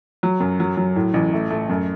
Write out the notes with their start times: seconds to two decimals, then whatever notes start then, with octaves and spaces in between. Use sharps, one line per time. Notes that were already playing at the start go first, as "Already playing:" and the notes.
0.23 F#3
0.40 F#2
0.60 F#3
0.77 F#3
0.96 A2
1.14 A1
1.33 A3
1.50 A3
1.70 F#2